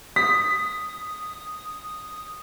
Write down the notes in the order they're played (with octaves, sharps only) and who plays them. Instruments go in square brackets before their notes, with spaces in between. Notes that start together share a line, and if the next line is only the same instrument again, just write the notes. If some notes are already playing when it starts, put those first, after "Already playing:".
[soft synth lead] D#6 [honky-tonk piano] B6